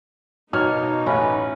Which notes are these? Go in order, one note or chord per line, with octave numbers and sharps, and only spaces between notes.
B2 A#3 D#4 C#5 F6
A1 C#4 B4